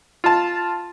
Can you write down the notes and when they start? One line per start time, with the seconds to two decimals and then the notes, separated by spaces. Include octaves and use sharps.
0.24 F4 A5